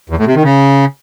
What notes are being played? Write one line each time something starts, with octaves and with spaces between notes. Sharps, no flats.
E2
A2
C3
D#3
C#3